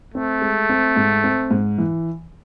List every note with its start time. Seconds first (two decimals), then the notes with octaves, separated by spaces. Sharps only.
0.14 A3 C4
0.42 G#3
0.69 C4
0.96 G#2
1.24 C4
1.51 G#2
1.78 E3